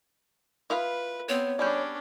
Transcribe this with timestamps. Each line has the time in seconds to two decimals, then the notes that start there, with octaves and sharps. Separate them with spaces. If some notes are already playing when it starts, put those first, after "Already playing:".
0.70 E4 F4 B4 F5 D#6 F7
1.29 B3 C4 C#5
1.59 G3 C#4 D4 G#4 D5 B5 G6